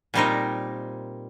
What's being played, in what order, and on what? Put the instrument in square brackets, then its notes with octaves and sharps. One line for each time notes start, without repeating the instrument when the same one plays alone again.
[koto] A#2 G3 C4 D#4 A#4